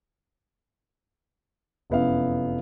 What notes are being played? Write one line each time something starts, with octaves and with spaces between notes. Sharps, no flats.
F1 F#2 B3 E4 F5